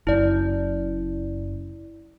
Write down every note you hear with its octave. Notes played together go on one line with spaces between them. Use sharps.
F#1 F#2 E4 D5